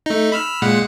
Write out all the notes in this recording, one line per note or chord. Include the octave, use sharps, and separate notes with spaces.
A3 D#4
B5 E6 F6
A#2 G#3 F#5